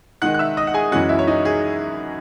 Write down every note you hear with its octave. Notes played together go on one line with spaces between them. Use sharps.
D#3 G#3 D#4 F#5 F#6
F#6
E5 E6
D#5 D#6
F#5
G#4 G#5
F#2 E3 G#3 C#4 F#4 F#5
E4 E5
C#5
D#4 D#5
G#4